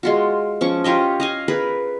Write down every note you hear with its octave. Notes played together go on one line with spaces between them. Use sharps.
G#3 F4 F#4
F3 C#4 C#6
F4 G4 C#5 D#5
D#5 F5 G#5
G#4 A#4 B4